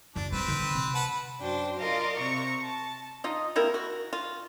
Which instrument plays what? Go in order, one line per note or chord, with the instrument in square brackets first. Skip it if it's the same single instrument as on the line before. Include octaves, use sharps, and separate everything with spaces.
[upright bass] C#2 F#2 [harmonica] D4
[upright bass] F#3 G3 [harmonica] C4 B4
[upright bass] D3 D#3
C3
[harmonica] B4 F#5 A5
[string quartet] F#2 D4 F#4 C5 G5
F4 A#4 D5 D#5 F5
C3 A#5 C#6
A5
[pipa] D#4 F4 D#5
C3 A#3 E4 A#4
F#4
F4